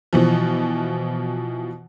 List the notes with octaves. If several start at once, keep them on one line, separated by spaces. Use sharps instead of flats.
B2 E3 F3